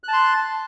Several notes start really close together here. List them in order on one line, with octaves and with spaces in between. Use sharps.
F#6 A5 C6